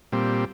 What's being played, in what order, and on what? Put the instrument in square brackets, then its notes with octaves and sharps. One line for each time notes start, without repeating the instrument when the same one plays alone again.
[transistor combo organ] A#2 G3 C4